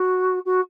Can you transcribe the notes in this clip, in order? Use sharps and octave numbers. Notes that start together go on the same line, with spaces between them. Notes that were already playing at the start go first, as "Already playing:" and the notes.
Already playing: F#4
F#4